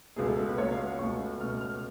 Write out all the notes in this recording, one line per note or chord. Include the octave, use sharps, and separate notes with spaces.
C#2 B2 A3 G#4
A4
B4
C#2 B2 A3 C#5
F5
F#5
C#2 B2 A3 C#6
C#2 B2 A3 F6
F6